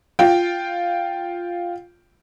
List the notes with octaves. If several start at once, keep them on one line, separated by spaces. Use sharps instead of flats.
F4 G5